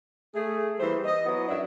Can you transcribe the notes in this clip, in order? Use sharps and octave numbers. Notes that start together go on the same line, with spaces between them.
A3 G#4
E3 G3 A#3 C5
D#5
F#3 B3 E4
F#2 D4 E4 E5 F#5